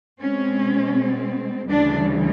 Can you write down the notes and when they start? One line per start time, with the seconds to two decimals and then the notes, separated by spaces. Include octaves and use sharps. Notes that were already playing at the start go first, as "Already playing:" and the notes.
0.21 B2 G#3 C4 C#4
1.68 D2 C#3 E3 G3 D4